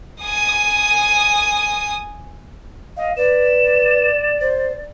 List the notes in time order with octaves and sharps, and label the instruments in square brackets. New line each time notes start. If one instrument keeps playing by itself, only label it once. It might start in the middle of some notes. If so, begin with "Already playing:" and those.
[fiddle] G#5 D#6
[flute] D#5 [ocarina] F5
[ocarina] B4 [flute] D5 [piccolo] E7
[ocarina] C5